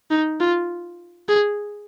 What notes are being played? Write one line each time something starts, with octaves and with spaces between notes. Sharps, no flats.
D#4
F4
G#4